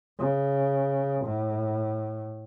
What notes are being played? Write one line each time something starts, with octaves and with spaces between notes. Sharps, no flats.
C#3
A2